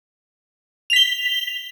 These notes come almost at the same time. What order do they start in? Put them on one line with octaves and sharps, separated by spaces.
F7 B6 G7